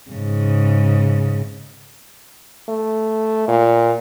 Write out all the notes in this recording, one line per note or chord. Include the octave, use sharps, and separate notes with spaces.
G#2 C#3
A3
A#2